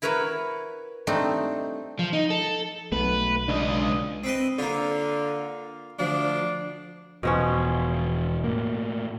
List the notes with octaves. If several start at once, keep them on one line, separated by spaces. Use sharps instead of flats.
E4 A#4 B4 C#5 E5 F#5
G3 A3 C4 D4 D#4
F3
D#4
A4
B1 A3 B3 B4
C#2 D4 D#5
C4 B4 D#5
D3 A#3 F4
D2 F3 D4
E1 B2 F3 B3 C#4
A2 A#3